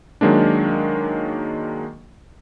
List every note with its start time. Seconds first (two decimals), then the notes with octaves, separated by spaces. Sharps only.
0.21 D#3 F#3 G#3 A#3 D4